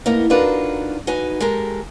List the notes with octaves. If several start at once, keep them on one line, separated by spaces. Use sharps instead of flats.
A2 A#3 B3 D#4
D4 D#4 F4 F#4 A#4 B4
D#4 F#4 B4 G#5
G#3 G4 A4 A#4